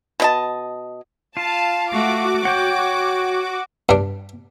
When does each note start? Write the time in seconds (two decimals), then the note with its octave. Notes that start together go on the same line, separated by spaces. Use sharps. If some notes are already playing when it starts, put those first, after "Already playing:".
0.20 B2 D#5 A5
1.37 F4 F5 A5
1.92 A3 F#4 D6
2.45 C#5 F#5 G5
3.89 G2 D4